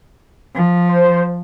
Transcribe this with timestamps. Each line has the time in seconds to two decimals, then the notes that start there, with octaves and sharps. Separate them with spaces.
0.55 F3
0.89 C5